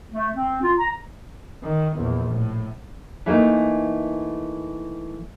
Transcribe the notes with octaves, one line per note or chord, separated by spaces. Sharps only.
A3
C4
F4
A#5
D#3
A#1 E2
A2
E3 A3 A#3 D#4